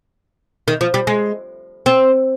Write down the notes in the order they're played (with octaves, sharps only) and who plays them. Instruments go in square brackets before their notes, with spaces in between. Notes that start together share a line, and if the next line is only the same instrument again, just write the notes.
[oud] D#3
F3
G3
G#3
C4